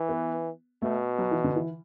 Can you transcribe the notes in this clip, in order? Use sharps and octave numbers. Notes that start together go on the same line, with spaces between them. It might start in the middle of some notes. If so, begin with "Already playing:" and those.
Already playing: E3
B3
B2 A3
F#3
E3
D3
E3